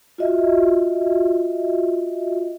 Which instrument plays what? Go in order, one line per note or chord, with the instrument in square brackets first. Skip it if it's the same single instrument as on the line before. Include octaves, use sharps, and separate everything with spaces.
[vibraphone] F4 F#4 D#5 E5